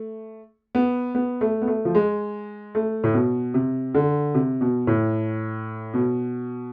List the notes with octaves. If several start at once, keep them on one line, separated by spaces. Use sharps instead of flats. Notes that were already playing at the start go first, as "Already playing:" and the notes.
Already playing: A3
B3
B3
A3
B3
A3
F3
G#3
A3
A2
B2
C3
D3
C3
B2
A2
B2